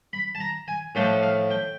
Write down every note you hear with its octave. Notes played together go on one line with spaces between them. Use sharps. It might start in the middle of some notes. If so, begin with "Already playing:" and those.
B5
A5
A#5
G#5
A2 F3 A3 D4 G5
F5
G5